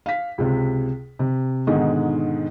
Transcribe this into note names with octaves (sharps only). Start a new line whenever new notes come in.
F5 B6
C#2 C3
C3
G#2 B2 D3 D#3 G#3